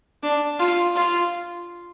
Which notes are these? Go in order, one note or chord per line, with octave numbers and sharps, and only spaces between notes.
D4
F4
F4